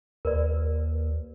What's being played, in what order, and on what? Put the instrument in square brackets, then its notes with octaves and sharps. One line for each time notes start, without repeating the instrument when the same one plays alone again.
[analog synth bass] D#2 [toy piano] A#4 B4 D5